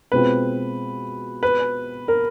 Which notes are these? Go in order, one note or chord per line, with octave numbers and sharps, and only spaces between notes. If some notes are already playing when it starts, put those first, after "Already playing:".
B2 G#3 C4 F4 B4
B4
A#4